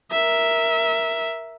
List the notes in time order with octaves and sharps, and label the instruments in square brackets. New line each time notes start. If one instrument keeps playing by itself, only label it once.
[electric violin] A#4 E5